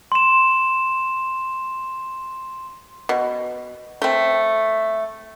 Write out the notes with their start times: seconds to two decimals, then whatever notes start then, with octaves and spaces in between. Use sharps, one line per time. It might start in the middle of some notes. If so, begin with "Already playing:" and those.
0.12 C6 E7
3.09 B2
4.02 A3 C4